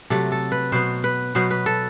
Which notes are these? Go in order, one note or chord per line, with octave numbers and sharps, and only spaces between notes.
C3 F#3 A3 A4
A4
B4
B2 F#3 B3 C5
B4
B2 F#3 B3 C5
B4
A4